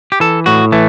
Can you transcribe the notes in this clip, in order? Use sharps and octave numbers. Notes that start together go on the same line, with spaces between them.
G4
E3 A4
A2 F#4
E3 A3